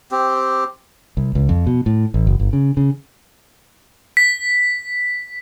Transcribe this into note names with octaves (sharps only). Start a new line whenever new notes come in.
C4 G4
C2
C#2
F2
B2
A2
A1
F#1
G1
C#3
C#3
B6